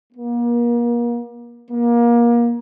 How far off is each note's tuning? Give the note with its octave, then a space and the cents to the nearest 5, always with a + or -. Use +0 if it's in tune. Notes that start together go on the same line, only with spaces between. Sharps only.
A#3 +35
A#3 +25